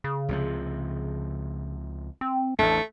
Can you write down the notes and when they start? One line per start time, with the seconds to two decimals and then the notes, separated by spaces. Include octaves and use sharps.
0.04 C#3
0.29 C#2 C3 F3
2.21 C4
2.59 A1 E2 A3 D4